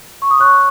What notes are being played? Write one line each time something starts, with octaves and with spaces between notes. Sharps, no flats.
C#6
D#6
C#5 C#6 F#6